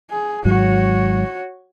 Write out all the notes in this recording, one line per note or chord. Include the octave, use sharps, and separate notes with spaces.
G#4
G#1 G#2 F#3 F#4 C#5